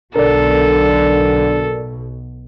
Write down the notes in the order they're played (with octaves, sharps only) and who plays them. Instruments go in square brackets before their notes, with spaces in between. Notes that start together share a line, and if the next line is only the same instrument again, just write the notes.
[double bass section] B1 B2 [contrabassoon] D3 [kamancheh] A4 [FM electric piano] A#4 D5